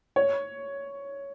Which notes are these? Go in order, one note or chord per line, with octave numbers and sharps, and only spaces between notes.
C#5